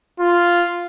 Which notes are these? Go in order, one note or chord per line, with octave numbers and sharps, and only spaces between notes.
F4